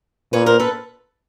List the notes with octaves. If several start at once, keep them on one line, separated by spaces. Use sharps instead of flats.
A#2 B4 C#5
A#4 C5
A4 B4